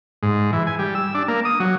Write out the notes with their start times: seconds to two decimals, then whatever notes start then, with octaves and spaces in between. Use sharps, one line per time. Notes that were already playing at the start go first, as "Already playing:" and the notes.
0.23 G#2
0.53 E3
0.67 G#5
0.79 G3
0.95 E6
1.15 D4
1.28 A#3
1.45 D#6
1.60 F#3